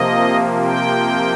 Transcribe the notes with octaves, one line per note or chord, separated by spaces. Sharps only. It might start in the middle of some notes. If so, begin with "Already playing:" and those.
Already playing: C3 F3 A#3 D#5
G5